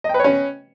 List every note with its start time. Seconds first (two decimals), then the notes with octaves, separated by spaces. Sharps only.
0.04 D#5
0.09 G5
0.14 B4
0.19 C#5
0.24 C#4